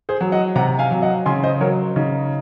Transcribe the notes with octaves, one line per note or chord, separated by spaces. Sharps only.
G#4 C5
F#3
D#5 F#5
C3 F#5 A#5
F5 G#5
F#3
D#5 F#5
C#3 G#5 C6
C5 D#5
F#3 A#4 C#5
C#3 D#4